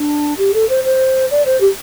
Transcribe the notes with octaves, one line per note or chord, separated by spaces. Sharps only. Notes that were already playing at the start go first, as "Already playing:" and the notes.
Already playing: D4
G4
A4
C5
C5
D5
C5
G4